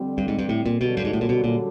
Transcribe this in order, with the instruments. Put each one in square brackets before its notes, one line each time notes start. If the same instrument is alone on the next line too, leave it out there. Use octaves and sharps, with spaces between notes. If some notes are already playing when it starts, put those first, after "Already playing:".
Already playing: [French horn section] F2 D3 G3 C4
[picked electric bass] G2
G#2
G2
A2
A#2
[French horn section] F#2 D3 G3 [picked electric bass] B2
[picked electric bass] G2
G#2
A2
A#2
B2
A#2